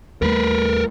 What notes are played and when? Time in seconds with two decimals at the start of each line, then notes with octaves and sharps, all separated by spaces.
0.22 D#2 G3 A3 A#4 B4